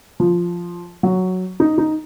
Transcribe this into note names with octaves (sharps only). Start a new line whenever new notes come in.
F3
F#3
D#4
D#4